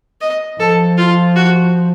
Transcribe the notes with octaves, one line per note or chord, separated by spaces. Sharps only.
D#5
F3 A4
F4
F#4